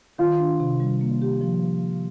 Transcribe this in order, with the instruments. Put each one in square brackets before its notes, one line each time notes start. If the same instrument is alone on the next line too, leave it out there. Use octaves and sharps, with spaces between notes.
[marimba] D#3 [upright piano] F4
[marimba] D4
C3
G3
A#3
G4
F3